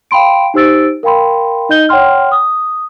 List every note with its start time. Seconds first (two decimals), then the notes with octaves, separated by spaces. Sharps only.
0.11 F5 G5 B5 C6 D7
0.54 D#4 G4 C5 E6 A6 D7
1.03 A#4 F5 G5 B5 C6
1.69 D#4 D#5 G6 G7
1.89 C#5 F#5 G5 C6 F6
2.32 D#6